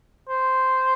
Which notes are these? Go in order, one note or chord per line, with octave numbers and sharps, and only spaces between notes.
C5